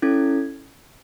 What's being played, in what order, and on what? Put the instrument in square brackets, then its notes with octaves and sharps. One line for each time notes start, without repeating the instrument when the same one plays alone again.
[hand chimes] C#4 E4 A4 G#6